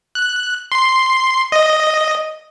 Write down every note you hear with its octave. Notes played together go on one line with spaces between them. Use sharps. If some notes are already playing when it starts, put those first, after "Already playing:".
F#6
C6
D#5